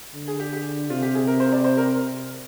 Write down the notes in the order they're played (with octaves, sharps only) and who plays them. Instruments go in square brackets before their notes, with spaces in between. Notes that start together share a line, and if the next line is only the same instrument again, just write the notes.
[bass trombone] D3
[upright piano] G#4
G4
G4
[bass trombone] C3 [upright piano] F4
[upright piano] G4
G#4
A#4
C5
D5
C5
A#4